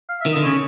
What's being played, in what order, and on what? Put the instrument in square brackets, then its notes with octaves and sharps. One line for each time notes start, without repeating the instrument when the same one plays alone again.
[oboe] F5
E5
[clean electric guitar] D#3
[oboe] D#5
[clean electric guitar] D3
[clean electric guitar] C#3 [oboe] C#5